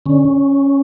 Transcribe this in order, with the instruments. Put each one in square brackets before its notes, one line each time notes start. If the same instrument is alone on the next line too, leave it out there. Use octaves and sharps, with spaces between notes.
[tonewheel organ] D3 C#4